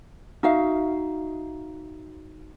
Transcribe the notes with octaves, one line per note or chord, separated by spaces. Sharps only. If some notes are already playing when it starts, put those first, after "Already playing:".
D#4 F#4 E5 F5